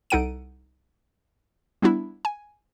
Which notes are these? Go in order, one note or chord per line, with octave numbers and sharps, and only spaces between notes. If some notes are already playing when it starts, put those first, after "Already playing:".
C2 D#4 A4 F#5 D7 D#7
G3 B3 D4 E4
G#5